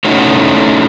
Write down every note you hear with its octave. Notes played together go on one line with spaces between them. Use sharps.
A3 C#4 D#4 E4 F#4